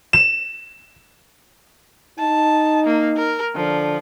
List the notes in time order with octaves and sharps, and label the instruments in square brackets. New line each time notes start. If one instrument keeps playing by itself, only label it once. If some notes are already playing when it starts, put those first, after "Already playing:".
[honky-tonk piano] E7
[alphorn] D#4 [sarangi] A5
[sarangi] A#3
A#4
[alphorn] D3 [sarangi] F3